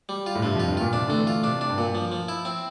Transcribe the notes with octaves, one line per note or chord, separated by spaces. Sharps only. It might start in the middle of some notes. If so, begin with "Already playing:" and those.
G3
F4
A2
G2 C3
F2 F4
G2
A#2 F4
C3 D4
D3 A3
E3
F4
C3 D4
D4
G2
A#2
F3
F3
E4
C4